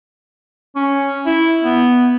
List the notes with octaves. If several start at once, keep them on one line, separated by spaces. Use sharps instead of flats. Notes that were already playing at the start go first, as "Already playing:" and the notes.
C#4
E4
B3